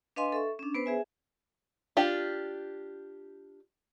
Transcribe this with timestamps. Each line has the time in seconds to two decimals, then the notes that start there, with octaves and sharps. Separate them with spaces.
0.16 D4 B4 D#5 F5 G#5 C6
0.32 A4 E5 C#6
0.59 C#4 D4
0.75 B3 B4 C5
0.86 G#4 E5 G#5
1.97 D4 F4 G4